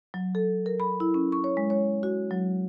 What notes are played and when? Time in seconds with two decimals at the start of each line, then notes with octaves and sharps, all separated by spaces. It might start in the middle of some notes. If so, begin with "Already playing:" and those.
0.14 F#3
0.35 A4
0.66 A#4
0.80 B5
1.00 E4
1.14 C#4
1.32 C#6
1.44 C#5
1.57 G#3
1.70 C#5
2.03 F#4
2.31 F#3